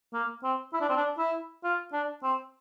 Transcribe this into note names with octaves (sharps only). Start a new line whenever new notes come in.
A#3
C4
E4
D4
C4
D4
E4
F4
D4
C4